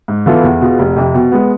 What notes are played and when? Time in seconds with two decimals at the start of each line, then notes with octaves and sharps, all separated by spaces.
0.08 G#2
0.26 E3 B3 F4 A4
0.44 E2
0.61 B2 B3 F4 G#4
0.79 F1
0.96 F2 C3
1.14 B2
1.32 G#3 B3